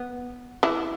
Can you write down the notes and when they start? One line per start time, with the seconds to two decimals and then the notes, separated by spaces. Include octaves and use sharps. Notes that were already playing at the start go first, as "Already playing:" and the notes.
Already playing: B3
0.63 E3 E4